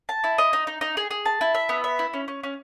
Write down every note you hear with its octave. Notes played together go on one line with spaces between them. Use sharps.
A5
E4
D#5
D#4
D#4
D#4
G#4
G#4
A5
E4
E5
B3
E5
E4
C#4
C#4
C#4